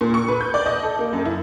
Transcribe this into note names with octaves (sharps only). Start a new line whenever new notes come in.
A#2
C#6
B4
G6
D5
D#5
A4
A#3
F#2
E4